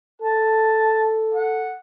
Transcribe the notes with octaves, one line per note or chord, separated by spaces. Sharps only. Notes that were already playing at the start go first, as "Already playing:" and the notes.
A4 A5
F#5